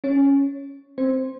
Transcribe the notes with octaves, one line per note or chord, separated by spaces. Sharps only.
C#4 C#5
C4 C5